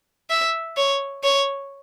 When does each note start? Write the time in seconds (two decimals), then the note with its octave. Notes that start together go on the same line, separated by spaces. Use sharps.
0.30 E5
0.77 C#5
1.23 C#5